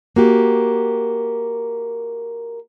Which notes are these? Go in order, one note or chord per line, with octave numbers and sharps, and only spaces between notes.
A#3 F#4 G4